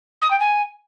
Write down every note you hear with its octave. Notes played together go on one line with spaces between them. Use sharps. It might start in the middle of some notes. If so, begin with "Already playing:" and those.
D#6
G5
G#5